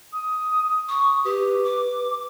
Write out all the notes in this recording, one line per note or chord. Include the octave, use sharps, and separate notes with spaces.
D#6
C#6 D#6
G4 B4
D6